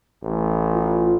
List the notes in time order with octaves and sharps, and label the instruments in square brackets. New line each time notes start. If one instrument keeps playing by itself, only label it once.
[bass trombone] A1
[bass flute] F4